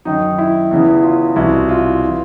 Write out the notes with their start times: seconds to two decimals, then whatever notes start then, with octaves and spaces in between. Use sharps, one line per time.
0.05 F#2 D#3 D#4
0.38 E4
0.71 E2 C#3 E3
1.03 F4
1.36 C2 B2 E4
1.69 F4
2.05 E3